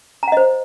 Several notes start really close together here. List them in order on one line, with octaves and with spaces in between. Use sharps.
A#5 F#5 D#5 C5